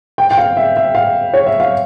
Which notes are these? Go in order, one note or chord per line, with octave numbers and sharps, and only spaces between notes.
G5
G5
F5
E5
E5
F5
C#5
E5
F5